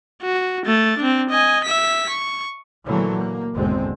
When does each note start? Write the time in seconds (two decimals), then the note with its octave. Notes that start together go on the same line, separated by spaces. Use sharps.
0.22 F#4
0.66 A3 A6
0.98 C4 D4
1.30 D#5 G#5
1.64 E5 B6
2.09 C#6
2.85 A#2 D3 E3 F#3 A3 A#3
3.15 A#3
3.54 G#1 E2 B2 D3 G#3 C4